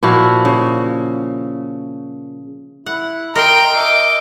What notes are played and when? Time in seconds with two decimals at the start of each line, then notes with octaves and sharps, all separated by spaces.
0.03 A#2 F3 E4 F#4
0.45 C#3
2.86 E4 F#5
3.35 A#4 D#5 G5 A#5 C6
3.76 D#5 E5 D6